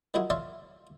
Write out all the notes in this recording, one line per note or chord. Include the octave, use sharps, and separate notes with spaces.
D#3 F3 F#3 E4 F#4 G#4
C#5 D5 E5 F5 A5 C6